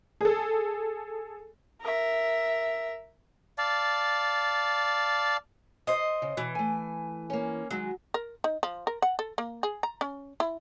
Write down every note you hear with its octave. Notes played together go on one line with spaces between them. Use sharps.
G#4 A4
A#4 E5
D5 F5 A5
C5 D#5
C#3
B2 E3
A3 G#5
A#3 C#4
D#3 F#3 G#3
A#4
D#4
F3
A#4
F#5
A4
A#3
G#4
A#5
C#4
E4